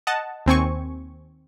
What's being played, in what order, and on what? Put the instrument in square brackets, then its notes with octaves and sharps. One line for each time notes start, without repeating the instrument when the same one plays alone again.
[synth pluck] D#5 F#5 A5
D#2 C4 G#5 C#6